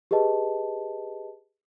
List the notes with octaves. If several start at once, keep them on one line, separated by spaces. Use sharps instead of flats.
G4 G#4 B4 D#5 A5